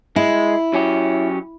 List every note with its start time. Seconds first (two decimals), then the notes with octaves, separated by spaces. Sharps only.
0.16 G#3 E4
0.73 F#3 C#4 G4